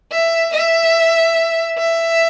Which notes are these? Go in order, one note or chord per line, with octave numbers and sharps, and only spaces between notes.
E5
E5
E5